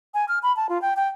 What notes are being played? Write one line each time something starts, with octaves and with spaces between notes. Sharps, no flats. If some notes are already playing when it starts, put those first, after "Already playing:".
G#5
F6
B5
A5
F4
G5
G5